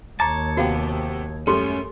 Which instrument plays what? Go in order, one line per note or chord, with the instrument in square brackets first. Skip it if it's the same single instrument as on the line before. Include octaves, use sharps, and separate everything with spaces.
[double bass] D#2 [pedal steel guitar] C#5 A5 [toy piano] A#5 D6
[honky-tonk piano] C3 B3 G4 [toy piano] F#4 F5
[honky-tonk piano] F#2 G3 A3 [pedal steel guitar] C#4 [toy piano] G4 A4 C6